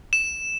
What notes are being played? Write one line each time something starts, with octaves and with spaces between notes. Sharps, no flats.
E7